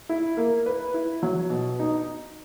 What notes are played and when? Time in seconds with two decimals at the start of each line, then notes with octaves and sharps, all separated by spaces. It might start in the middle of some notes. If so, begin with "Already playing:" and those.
0.09 E4
0.37 A#3
0.66 B4
0.94 E4
1.23 F#3
1.50 B2
1.79 D#4